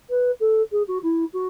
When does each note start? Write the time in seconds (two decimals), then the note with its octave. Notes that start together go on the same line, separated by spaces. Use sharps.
0.09 B4
0.40 A4
0.72 G#4
0.87 F#4
1.02 E4
1.33 F#4